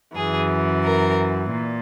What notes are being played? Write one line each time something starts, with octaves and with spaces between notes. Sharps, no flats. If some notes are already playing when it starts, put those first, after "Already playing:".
F#2 E3 G#4
A#4
A#2